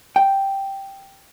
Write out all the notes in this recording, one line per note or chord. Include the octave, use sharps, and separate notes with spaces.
G5